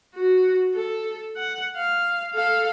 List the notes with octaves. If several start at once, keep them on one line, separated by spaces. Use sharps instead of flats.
F#4
A4
F#5
F5
A4 F5